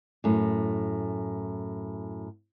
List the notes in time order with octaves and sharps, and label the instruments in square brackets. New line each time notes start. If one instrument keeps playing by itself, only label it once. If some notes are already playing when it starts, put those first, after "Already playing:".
[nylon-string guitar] F#2 A2